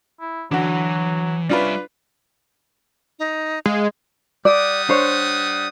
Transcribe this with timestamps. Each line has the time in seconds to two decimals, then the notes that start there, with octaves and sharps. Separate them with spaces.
0.20 E4
0.51 D3 E3 F#3 F#4
1.49 G3 C#4 D4 F4 B4 E5
3.19 D#4
3.66 G#3 F5
4.45 G3 D5 F#5 D#6
4.89 D4 C5 C#5